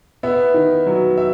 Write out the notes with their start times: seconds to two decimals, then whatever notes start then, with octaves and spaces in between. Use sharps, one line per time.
0.23 B3 E5
0.54 D#3
0.87 F#3
1.17 E5